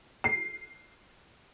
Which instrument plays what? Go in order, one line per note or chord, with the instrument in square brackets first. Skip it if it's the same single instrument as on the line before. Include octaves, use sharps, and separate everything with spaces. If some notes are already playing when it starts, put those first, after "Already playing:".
[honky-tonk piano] C7